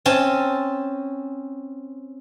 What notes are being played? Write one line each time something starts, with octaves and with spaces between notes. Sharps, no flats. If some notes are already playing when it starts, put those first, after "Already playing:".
C4 C#4 A5